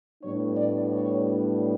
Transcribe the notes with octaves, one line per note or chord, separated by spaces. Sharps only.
A2 G3 B3 D4 C#5
D5
C#5